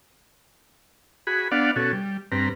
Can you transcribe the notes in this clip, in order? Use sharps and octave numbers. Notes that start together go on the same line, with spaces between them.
F#4 G#4 B5
B3 D4 D5 F5 F#5
B2 C#4 F#4 A4
G3
G2 C4 B4 A#5